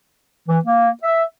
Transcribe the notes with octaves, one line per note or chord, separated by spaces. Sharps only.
E3
A#3
E5